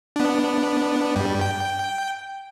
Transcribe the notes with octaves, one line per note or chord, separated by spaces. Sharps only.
B3 D4
G2 G3
G5